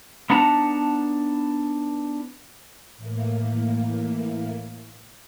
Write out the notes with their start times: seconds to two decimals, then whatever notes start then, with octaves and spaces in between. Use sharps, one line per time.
0.30 B3 D4 D#4 F#5 A5 A#5
2.97 A2 E3 A#3